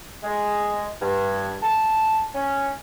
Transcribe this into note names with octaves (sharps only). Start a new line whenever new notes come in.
G#3
G2
A5
C#4